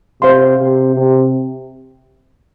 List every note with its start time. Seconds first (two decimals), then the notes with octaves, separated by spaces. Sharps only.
0.22 C3 C5 F5 C6
0.58 C3
0.95 C3